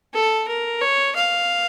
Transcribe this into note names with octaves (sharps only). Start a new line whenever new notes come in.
A4
A#4
C#5
F5